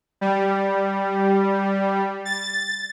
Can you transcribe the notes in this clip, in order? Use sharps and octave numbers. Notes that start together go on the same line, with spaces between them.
G3
A6